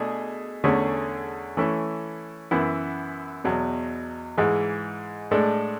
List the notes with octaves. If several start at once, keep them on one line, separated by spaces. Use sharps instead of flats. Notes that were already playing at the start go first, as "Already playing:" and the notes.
Already playing: B2 A3 D4 G#4
E2 D3 A3 C#4 G#4
E3 A3 C#4 E4
F#2 E3 B3 E4
E2 B2 F#3
G#2 E3 G#3
A2 G#3 D4 A4